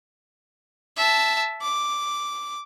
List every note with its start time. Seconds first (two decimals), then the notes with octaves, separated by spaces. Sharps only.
0.97 E5 A5
1.62 D6